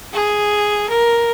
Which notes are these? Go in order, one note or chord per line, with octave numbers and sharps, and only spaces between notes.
G#4
A#4